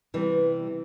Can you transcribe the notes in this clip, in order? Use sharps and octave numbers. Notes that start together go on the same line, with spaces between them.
C3 E3 G3